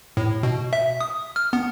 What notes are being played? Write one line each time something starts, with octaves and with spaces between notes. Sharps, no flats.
A2
B2
E5
D#6
F6
B3